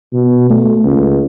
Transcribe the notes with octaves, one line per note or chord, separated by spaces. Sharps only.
B2
A3
C#2